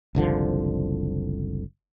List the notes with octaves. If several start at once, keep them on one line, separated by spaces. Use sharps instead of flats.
F#1 C2 D3 F3